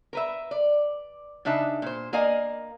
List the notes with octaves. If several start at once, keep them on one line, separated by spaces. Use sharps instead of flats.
A#4 B4 E5
D5
C#3 D4 D#4 E5 A5
A#2 C5
A#3 A#4 D5 D#5 F5 G#5